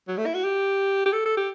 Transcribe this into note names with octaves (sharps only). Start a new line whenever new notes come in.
F#3
A3
E4
F#4
G4
G4
A4
A4
G4